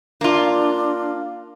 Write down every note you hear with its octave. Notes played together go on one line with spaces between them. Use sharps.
A#3 D4 F4